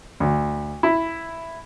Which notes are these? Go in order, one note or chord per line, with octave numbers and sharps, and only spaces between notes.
D2
E4